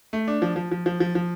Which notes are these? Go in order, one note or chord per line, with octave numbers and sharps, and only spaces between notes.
A3
D4
F3
F3
F3
F3
F3
F3